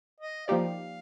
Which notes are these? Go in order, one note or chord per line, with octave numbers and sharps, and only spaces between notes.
D#5
F3 A#3 D#4 G4 D5 F5